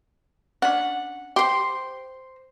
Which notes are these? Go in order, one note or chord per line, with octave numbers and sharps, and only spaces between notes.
C#4 D4 F#5
G4 C5 C6